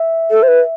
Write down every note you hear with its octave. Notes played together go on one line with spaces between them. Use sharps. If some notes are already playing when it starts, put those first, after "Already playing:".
Already playing: E5
A4
C5
B4